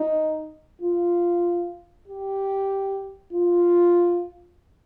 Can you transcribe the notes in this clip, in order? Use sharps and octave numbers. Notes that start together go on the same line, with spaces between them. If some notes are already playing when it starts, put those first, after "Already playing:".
Already playing: D#4
F4
G4
F4